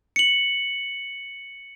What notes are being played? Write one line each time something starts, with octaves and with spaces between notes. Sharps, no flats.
C#7 F#7